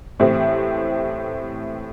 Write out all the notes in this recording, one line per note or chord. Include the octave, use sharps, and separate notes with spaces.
A2 E3 A3 C4 G4